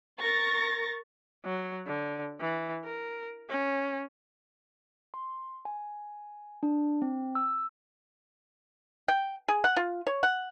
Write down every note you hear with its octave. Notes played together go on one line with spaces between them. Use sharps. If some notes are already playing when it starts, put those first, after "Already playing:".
A#4 C#6 A6 A#6
F#3
D3
E3
A#4
C#4
C6
G#5
D4
C4
E6
G5
G#4
F#5
F4
C#5
F#5